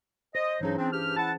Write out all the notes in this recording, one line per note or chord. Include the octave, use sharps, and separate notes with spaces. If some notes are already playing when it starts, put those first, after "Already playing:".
C5 D#5
G2 E3 F#3 C#4 D#4 G#4
C4 D4
G2 G4 F6
E4 F#5 A5